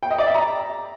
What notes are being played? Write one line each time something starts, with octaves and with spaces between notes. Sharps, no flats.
G5
D#5
D5
E5
A#5